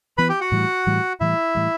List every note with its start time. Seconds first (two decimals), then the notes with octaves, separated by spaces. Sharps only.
0.18 E3 B3 B4 B5
0.29 G4 G5
0.41 F#4 F#5
0.52 A2 E3 G3
0.87 A2 E3 G3
1.20 A2 E3 G3 E4 E5
1.55 A2 E3 G3